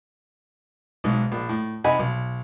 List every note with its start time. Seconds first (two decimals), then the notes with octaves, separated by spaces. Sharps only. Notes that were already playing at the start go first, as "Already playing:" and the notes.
1.04 B1 G#2
1.32 A#1
1.49 A2
1.84 C3 D#4 F#5 G#5 B5
1.99 B1